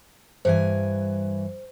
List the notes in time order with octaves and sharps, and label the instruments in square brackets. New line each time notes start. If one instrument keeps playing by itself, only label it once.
[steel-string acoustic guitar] G2 E3 G#5 [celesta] C5